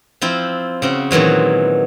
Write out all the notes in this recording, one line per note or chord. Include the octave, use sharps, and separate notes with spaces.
F3 C4 E4
C#3 C4 F#4
A#2 D#3 E3 F#3 G#3